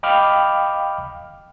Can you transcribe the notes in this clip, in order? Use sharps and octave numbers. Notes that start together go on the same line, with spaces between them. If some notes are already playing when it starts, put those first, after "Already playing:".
D#5 F5 G5 B5 D6 F6